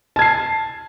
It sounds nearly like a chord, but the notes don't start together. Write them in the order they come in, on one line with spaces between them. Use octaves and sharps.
A5 G#6 C7